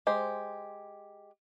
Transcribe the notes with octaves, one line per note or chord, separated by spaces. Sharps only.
G#3 G4 C5